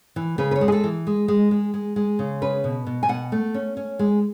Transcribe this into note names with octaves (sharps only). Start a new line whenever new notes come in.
E3
C#3 B4
B4
C#5
G#3
G#4
A4
E3
G#3
G#3
G#3
G#3
G#3
C#3
C#4 B4
B2
B2
G#5
B2 F#5
A3
C#4
C#4
G#3